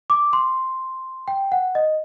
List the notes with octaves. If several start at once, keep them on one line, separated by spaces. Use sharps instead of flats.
D6
C6
G5
F#5
D#5